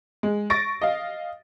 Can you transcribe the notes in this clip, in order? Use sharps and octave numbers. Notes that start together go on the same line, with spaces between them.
G#3
C#6 A6 A#6 D7
D#5 F5